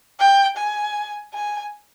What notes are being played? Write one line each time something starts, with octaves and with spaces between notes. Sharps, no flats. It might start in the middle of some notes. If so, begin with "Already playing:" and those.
G5
G#5
G#5